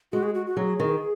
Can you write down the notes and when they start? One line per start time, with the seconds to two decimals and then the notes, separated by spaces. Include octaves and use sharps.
0.13 G#3 F#4
0.23 G#4
0.35 F#4
0.47 F#4
0.57 F#3 G#4
0.80 D#3